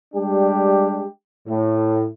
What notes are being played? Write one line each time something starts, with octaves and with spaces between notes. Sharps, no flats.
G3 G#3 D4 G4
A2